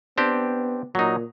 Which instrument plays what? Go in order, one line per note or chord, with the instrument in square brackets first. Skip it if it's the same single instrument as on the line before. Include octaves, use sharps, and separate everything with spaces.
[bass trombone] B3 [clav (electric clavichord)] C4 D4 G4
[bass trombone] A#2 [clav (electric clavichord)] F#3 D#4